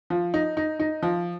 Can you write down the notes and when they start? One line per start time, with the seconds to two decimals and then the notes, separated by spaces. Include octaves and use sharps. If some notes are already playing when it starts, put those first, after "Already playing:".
0.10 F3
0.34 D#4
0.57 D#4
0.80 D#4
1.03 F3